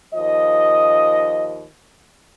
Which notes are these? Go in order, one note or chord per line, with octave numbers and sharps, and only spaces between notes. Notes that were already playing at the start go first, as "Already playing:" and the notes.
D#2 F3 D#5